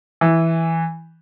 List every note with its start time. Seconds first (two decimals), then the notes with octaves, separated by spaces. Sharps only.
0.21 E3